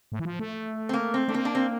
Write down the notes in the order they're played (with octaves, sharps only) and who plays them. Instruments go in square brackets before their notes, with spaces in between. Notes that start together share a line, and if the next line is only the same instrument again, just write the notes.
[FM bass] A2
E3
F3
A3
[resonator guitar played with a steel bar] C4
A#3
C4
[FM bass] A3 [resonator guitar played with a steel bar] D4
[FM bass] A#3 [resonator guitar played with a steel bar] C4
[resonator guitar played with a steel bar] D4
C4